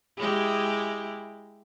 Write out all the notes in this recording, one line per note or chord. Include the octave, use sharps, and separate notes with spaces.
G#3 E4 G4